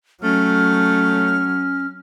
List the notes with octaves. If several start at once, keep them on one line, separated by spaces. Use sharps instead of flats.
F#3 A3 C#4 F6